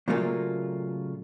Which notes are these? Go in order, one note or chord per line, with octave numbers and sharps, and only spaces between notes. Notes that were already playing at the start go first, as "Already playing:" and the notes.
A#2 C#3 F#3 A3 A#3 F4